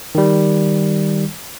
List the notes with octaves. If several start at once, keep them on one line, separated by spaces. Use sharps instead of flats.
D#3 G3